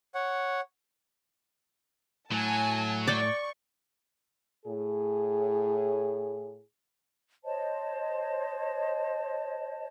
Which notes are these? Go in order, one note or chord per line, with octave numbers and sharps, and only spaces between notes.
C#5 F#5
A2 F#3 G#5 A5
D5 G5 C#6
A2 G#4
C5 C#5 D#5 A5